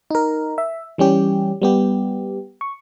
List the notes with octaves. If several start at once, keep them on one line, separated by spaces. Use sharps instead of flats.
D#4 A#4
E5
E3 G3 C#4 G4
G3 B3 G4
C#6